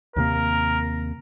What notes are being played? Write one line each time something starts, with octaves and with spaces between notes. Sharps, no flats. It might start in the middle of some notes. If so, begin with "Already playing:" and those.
D#2 C3 A#3 A#4